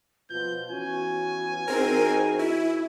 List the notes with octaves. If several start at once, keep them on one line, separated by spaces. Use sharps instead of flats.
B2 F3 B3 F4 G6
E3 B3 C#4 F#4 G#5
E3 C4 D#4 F#4 G#4 A#4
E4